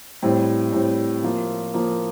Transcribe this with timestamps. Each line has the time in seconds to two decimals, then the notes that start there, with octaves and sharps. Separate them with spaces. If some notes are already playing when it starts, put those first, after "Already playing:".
0.22 A2 G3 C4
0.72 A2 G3 C4
1.23 F3 A#3 F4
1.74 F3 A#3 F4